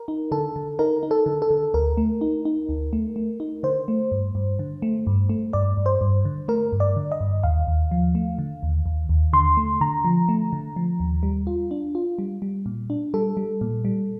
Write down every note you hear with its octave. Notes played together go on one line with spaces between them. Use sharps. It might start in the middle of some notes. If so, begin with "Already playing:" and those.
Already playing: A#4
D#4
D3 A4
D3
D#4 A#4
D#4
A4
D3
A4
D3
D2 A#4
A3
D#4
D#4
D2
A3
A3
D#4
D3 C5
A3
G2
G2
D3
A3
G2
A3
G2 D5
G2
C5
G2
D3
A3 A#4
G2
D5
D3
D#5
G2
D#2 F5
D#2
F3
A3
D3
D#2
D#2
D#2
D3 C6
A3
D3 A#5
F3
A3
D3
F3
D#2
G3
F4
D4
F4
G3
G3
A#2
D4
G3 A4
G3
A#2
G3